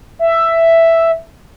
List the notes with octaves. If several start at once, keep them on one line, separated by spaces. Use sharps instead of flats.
E5